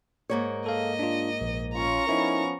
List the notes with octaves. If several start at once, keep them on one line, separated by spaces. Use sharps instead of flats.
G#2 A#3 C#5
A4 D#5 F5
D4 F4
A#1
C#4 F4 A#5 C#6
F3 B3 C#4 D#4 E4 A#4